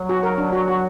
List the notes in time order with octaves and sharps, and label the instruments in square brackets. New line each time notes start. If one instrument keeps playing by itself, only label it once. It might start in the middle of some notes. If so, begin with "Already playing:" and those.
Already playing: [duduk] F#3
[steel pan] F#4
A#4
D4
F#4
F#4